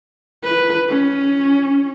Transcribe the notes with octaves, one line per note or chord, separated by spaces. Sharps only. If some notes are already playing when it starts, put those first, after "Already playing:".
B4
C#4